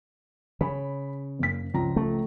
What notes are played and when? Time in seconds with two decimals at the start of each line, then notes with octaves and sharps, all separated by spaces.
0.61 C#3 B5
1.39 F#1 A#3 B6
1.74 C#2 F3 A#5
1.96 A3